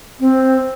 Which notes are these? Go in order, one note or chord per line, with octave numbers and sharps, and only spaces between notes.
C4